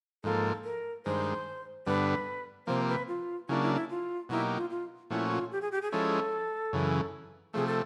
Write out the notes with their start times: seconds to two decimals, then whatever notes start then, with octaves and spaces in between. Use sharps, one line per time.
0.24 G#2 F3 A#3 A4
0.64 A#4
1.06 G2 D#3 G#3 C5
1.87 G2 D3 G3 B3 B4
2.67 C3 F3 A#3 C5
2.88 B4
3.08 F4
3.49 C#3 F#3 A#3 D4 E4
3.62 E4
3.75 E4
3.90 F4
4.29 B2 F#3 A#3 D#4 E4 G4
4.56 F4
4.70 F4
5.10 A#2 F3 A3 C#4 E4 F#4
5.31 F4
5.52 G4
5.61 G#4
5.72 G4
5.82 G#4
5.91 F3 G#3 C#4 E4 A4
6.73 F#2 C#3 E3
7.54 C3 F3 A3 G#4
7.67 A4